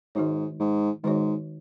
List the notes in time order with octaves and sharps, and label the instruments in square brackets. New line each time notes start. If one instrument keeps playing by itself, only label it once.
[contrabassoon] G#2 [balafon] D#3 G#3 D#4 F#4 C#5
[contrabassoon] G#2
[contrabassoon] G#2 [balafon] D#3 G#3 D#4 F#4 C#5